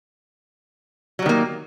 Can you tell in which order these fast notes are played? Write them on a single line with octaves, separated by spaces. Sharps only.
F#3 G3 D#3 A#3